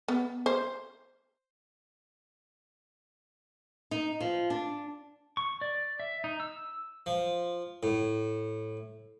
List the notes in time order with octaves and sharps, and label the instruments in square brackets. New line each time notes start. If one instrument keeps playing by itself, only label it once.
[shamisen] B3
C5
[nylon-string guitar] D#4
F3
D4
[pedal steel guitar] C#6
D5
E5
D#4
E6
[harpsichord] F3
A2